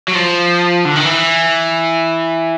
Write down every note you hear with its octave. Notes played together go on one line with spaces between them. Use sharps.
F#3
F3
D3
D#3
E3